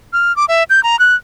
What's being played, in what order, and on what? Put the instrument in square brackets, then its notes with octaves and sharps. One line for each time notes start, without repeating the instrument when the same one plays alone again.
[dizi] F6
D6
E5
G6
A#5
F#6